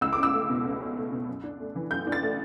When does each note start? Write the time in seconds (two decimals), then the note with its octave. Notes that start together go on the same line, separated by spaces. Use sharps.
0.01 C#2 E6
0.13 C#4 D6
0.23 E6
0.33 A3
0.50 B2
0.65 C#2
0.80 C#4
0.97 A3
1.12 B2
1.28 F#2
1.44 D4
1.60 A3
1.76 E3
1.91 F#2 G6
2.07 D4
2.12 A6
2.22 A3